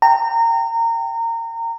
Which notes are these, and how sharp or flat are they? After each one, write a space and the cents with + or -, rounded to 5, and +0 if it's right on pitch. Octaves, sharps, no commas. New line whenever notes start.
G5 -5 A#5 -25